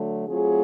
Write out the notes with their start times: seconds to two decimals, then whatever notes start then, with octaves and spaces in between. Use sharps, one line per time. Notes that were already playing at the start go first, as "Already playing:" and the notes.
Already playing: D3 F#3 A3
0.27 F#3 A3 C4 F4 G#4